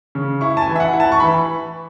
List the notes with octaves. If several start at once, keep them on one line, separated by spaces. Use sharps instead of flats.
C#3
E4 C#6
A5
G#5
E3
E5
F#5
E4
A5
C#6
E3 B5